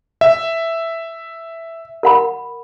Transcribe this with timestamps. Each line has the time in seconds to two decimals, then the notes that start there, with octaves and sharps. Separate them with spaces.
0.21 E5
2.03 A#4 F#5 B5